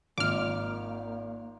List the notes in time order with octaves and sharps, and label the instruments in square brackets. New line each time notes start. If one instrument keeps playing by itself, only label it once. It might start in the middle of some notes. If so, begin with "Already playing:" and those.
[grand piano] G#1 [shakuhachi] A#3 [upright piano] D#4 F4 [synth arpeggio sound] D6 F6